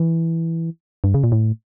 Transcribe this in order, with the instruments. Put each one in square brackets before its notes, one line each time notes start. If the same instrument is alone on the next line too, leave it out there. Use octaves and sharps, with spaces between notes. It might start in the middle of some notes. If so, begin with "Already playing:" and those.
Already playing: [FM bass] E3
G2
C#3
A#2
A2